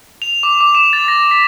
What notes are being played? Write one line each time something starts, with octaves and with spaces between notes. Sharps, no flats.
F7
D6
D6
E7
A6
A#6
B6